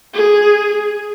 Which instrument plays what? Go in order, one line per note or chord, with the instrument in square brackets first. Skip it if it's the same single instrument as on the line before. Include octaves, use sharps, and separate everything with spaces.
[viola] G#4